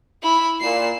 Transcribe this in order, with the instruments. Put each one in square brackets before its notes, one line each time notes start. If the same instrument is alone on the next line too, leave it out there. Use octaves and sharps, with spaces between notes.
[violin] E4 B5
[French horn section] A#2 [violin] C7 E7